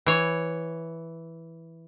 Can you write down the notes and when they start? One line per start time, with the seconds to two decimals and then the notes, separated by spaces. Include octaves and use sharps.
0.06 E3 C#5